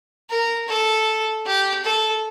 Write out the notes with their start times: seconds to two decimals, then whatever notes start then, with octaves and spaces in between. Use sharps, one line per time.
0.30 A#4
0.68 A4
1.46 G4
1.84 A4